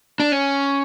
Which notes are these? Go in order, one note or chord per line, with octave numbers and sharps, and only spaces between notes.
D4
C#4